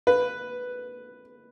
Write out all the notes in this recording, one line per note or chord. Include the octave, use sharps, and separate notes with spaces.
B4